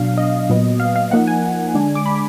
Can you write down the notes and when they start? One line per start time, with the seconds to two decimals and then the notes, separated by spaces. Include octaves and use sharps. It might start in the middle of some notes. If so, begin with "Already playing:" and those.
Already playing: B2 F#3 D4 F5
0.18 D#5
0.49 A#2 F#3 B3
0.80 F5
0.96 F5
1.11 F3 A#3 D#4 F#5
1.27 G#5
1.74 D3 G#3 D4
1.95 D6
2.06 B5